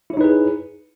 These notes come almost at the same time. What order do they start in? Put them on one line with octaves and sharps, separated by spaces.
E4 C#5 D#4 B4 G#4